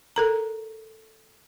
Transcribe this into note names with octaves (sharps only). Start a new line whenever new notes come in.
A4 A#4 A#5